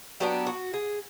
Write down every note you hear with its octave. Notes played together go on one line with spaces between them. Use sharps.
F#3 B3 D4 G4
F#4
G#4